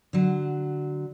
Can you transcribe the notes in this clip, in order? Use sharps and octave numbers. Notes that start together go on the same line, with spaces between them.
D3 F#3